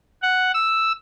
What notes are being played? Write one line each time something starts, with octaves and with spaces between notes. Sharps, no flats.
F#5
E6